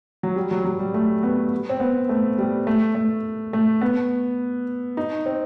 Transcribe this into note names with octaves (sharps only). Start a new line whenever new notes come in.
F#3
G3
F#3
F#3
G3
A3
B3
C4
B3
A3
G3
A3
A3
A3
B3
D#4
C4